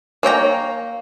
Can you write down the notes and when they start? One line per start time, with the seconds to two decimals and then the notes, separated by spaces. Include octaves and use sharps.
0.23 A#3 C#5 G5 A#5